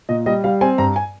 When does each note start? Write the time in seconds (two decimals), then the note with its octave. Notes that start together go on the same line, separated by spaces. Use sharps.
0.09 A#2 D#5
0.26 G3 D#5
0.44 G3 F5
0.61 C4 G#5
0.78 G2 A#5
0.96 G#5